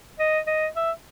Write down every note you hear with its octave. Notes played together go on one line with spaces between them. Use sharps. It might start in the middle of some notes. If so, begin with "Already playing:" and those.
D#5
D#5
E5